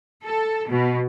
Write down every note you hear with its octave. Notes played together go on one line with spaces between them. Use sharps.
A4
B2